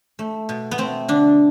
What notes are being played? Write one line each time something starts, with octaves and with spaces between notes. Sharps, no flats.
A3
B2
B3
A3 C4
D3 D4